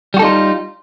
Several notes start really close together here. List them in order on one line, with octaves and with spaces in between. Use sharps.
G3 F#4 A4 D#4 F4